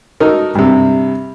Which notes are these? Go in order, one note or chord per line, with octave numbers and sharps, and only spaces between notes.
D#4 F#4 A4 A#4
G2 C3